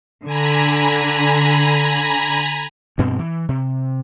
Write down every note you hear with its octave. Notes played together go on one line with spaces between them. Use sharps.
D3 G#5 A#5 B5
D2 G2 B2 C4
E3
C3